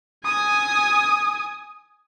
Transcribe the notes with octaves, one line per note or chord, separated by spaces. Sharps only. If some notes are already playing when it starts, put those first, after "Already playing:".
G#5 D#6